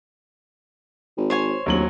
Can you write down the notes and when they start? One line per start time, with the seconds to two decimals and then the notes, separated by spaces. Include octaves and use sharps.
1.17 G#1
1.30 C5 C#5 G#5
1.66 D1 D#2 F#3 F#7